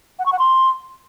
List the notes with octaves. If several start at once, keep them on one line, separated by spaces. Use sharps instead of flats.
F#5
C#6
F#5
C6